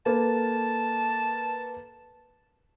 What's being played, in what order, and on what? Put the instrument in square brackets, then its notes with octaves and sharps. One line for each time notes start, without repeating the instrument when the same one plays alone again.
[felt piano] A#3 A4 B4 [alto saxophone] A5